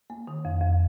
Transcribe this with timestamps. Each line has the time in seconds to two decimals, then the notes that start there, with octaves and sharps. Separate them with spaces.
0.10 A#3
0.27 D#3
0.45 F2
0.61 F2